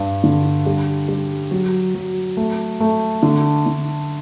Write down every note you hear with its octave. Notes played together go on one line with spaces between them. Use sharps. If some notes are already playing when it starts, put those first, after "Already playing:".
Already playing: G2
D3
G3
G3
F#3
F#3
A3
A3
D3
D3